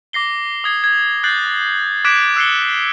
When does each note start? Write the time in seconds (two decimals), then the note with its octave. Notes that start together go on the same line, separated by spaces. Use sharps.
0.13 D6 A#6 C7 G7
0.64 D#6 G#6 C7
0.84 G#6
1.24 F#6 G6 A6 C7 F#7
2.05 D6 F#6 G#6 B6 D7 E7
2.36 E6 F#6 C7 C#7 G7